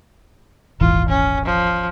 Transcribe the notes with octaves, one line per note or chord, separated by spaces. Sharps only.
D#1 G#1 E3 F4
C#4
F3